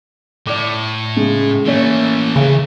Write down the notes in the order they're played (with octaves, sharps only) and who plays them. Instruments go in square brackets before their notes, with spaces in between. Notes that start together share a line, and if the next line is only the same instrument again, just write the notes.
[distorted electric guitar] A2 [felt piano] D5 D6
[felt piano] C#3 G#3
[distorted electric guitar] E3 A3 [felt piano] A#3 C#4 C#5
[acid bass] C#3